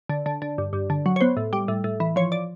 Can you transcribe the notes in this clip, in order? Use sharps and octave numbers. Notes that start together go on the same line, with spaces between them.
D3
D3
D3
G2
G2
D3
F#3
C#5
B3 C5
A2
G3
A2
A2
E3
F3 C#5
D5